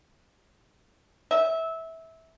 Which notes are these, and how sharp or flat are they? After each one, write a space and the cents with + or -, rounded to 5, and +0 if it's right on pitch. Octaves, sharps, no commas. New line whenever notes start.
E5 -20